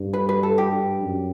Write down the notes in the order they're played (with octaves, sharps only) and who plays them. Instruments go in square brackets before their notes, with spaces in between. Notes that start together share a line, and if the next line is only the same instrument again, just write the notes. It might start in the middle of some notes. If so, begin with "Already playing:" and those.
Already playing: [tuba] G2
[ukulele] B4
B4
A4
G4
[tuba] F#2